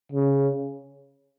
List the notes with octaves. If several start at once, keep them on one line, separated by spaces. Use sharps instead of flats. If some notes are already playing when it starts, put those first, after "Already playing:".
C#3